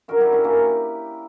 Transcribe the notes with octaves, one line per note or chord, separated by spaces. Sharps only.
F#2 D3 F#3 F#4 A#4
E4 G4
C#4 E4
A#3 C#4